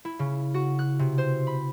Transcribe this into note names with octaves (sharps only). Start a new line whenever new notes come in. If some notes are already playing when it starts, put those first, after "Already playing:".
E4
C#3
F#4
F#6
C3
C5
B5